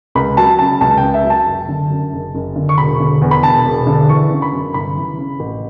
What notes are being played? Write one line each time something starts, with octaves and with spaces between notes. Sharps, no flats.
C#2 B5
F#3 A5
C#3 A5
C#2 A5
G5
C#2
E5
F#3
A5
F#1
D3
F#2
F#1
F#1
D3
C#6
E1 B5
D3
E2
B5
E1 A5
E1
D3
E3 C#6
C#3
B5
F#2
G1 B5
E3
C#3
A1